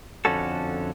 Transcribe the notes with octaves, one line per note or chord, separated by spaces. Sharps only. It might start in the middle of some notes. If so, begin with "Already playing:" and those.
F2 D3 C#4 F#4 A4